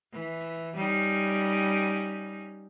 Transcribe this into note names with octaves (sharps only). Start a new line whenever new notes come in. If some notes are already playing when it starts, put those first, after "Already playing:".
E3
G3 C#4 D#4